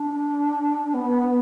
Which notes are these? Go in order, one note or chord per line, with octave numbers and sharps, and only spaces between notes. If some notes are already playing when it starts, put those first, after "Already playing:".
Already playing: D4
B3